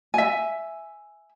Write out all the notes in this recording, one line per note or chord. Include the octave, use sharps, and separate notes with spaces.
E5 G#5